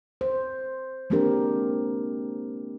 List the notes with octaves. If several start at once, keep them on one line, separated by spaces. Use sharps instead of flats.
C5
G#3 A#3 C4 D4 G4 A#4